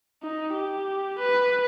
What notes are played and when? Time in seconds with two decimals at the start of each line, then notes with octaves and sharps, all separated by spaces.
0.23 D#4
0.53 G4
1.19 B4